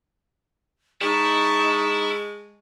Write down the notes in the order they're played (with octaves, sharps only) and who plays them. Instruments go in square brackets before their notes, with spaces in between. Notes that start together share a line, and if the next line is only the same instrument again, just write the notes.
[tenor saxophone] G#3 [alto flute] D#4 [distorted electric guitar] E4 [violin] A5 C#6